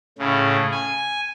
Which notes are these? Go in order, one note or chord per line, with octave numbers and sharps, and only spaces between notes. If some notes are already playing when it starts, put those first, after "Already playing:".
A2 C#3
G#5